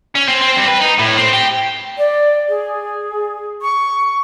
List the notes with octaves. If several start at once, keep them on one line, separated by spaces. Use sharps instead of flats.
C#4
C4
C4
G2
B4
D#4
A2
C4
G4
D5
G#4
C#6